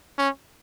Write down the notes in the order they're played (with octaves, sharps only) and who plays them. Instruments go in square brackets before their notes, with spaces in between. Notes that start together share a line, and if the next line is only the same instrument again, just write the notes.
[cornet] C#4